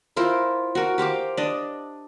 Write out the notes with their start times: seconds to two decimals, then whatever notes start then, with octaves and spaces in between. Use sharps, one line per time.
0.16 E4 F4 A#4 C5
0.75 F#4 A#4
0.98 G4 C5 F5 D6
1.37 D4 D#5